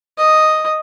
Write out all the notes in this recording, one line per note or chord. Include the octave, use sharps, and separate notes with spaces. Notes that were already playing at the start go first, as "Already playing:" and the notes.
D#5